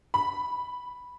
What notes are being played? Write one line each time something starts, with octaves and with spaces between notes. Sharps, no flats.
B5